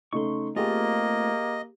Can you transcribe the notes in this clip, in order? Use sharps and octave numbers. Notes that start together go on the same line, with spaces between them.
C#3 A3 D#4 C6 C#6
A3 A#3 C4 F4 G4 G#4 D#5